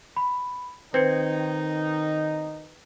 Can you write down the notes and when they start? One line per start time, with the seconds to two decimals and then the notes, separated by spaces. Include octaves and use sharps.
0.17 B5
0.94 D#3 C4 D#4 B4 G#6 C#7